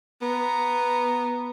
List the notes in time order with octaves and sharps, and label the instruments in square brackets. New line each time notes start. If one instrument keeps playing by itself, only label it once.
[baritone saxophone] B3 [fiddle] A#5